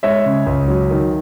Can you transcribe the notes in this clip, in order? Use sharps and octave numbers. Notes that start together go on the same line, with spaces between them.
G#3 C#5 E5
C#3
C#2
F#3
D#3